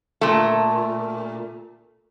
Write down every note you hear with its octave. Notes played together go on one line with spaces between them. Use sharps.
A#2 A3